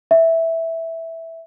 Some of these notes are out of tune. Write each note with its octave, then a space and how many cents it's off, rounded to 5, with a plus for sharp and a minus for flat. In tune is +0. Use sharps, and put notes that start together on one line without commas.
E5 -5